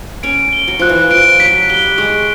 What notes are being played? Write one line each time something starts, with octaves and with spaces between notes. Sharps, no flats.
C#4 D7
G7
F#3
F3 F#6
E3
F3 D7
F#3 B6
G3 G7
G#3 C#6